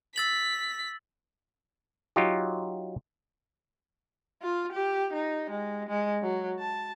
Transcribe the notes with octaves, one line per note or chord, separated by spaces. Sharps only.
E6 A6 B6 F#7
F#3 D#4 F4 G4
F4
G4
D#4
G#3
G#3
F#3
A5